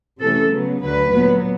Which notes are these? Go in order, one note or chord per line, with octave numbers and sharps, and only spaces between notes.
C3 E3 A3 C#4 A4
C#3 F#3 B3
D2 D3 F#3 B4
A#2 F#3 B3